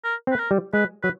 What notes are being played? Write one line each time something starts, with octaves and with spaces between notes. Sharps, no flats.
A#4
C4
B4
A#4
G3
G#3 B4
F#3 B4